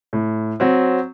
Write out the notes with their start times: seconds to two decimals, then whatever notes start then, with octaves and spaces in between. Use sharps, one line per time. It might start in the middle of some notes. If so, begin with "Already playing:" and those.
0.13 A2
0.60 F#3 C4